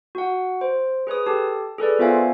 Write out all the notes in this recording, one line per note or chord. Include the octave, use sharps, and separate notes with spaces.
F#4 F#5
C5
G#4 B4 C#5 D#6
G4 A4 A5
G#4 A4 B4 D5
B3 F4 C5 E5 F5 G#5